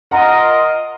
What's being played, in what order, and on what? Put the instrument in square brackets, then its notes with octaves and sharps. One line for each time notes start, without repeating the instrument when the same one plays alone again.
[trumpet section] F4 A#4 D#5 [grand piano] F#5 A#5